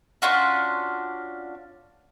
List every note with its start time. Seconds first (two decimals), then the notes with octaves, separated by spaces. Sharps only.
0.22 C#4 D4 F4 F#4